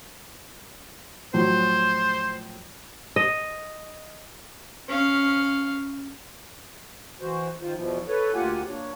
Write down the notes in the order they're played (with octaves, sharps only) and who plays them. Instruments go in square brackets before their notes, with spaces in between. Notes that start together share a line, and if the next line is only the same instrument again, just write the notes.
[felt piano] A2 F3 F#3 [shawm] C5
[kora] D#5
[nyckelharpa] C#4 F5
[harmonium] E3 F#4 C5
D#3 F4 C5
E2 B2 E3 F3
A4 B4 C#5
D2 A#3 F4 G4 F#5 G#5
A#3 D4 C#5